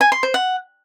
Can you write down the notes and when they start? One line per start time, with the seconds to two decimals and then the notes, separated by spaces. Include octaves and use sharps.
0.01 G#5
0.12 C6
0.23 C5
0.34 F#5